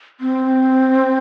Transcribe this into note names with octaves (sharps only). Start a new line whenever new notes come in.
C4